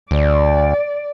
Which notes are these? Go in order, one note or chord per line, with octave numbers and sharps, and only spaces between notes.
D2 D5